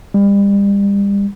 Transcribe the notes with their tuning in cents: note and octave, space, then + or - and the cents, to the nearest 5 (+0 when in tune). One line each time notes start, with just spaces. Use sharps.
G3 +35